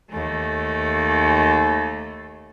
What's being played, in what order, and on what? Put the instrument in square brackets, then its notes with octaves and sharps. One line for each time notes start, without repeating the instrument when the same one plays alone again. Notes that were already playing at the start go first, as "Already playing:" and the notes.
[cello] D#2 A3